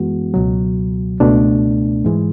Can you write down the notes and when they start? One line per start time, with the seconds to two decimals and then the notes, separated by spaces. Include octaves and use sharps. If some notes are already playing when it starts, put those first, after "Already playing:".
Already playing: F#2 E3 G#3 B3 F#4
0.34 C#2 B2 F#3
1.20 C#2 B2 A3 D4
2.05 G#2 E3 G#3